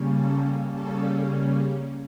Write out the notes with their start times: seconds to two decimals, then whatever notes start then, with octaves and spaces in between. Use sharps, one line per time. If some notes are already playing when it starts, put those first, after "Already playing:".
Already playing: C#3 G3 A#3 C#4
0.14 A4
0.68 C#3 G3 A#3 C#4 A4